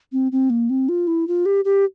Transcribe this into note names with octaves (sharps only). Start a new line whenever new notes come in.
C4
C4
A#3
C4
F4
E4
F4
G4
G4